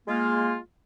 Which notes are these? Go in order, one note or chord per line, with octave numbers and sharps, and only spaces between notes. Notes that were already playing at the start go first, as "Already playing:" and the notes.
G#3 A#3 F4